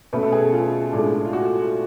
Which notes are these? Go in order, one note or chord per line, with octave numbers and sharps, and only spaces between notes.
B2 A3 C#4 B4
A4
G#4
F4
A2 G#3 D4
F4
F#4